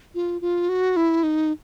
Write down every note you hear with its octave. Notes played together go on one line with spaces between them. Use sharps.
F4
F4
F#4
E4
D#4